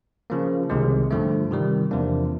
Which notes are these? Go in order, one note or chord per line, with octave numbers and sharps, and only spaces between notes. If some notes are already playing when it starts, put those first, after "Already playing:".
C#3 F3 A#3
C2 C3 D#3 G#3
G2 D3 F3 A3
C3 D#3 G3
E2 C3 F3 A#3 D4